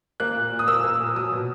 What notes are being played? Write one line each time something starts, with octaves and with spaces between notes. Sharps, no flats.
A#3 F#6
A#2
A#2
D#6
A#3 E6
A#3
A#2
F#3 D#6
B2